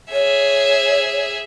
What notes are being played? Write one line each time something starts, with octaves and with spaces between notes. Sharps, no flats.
G#4 C#5 E5